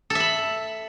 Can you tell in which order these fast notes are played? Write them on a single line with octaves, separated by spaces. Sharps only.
A4 E5 B5